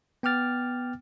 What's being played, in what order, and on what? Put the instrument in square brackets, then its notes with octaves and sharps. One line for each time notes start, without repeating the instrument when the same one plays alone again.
[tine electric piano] B3 G5 D6 F6 A6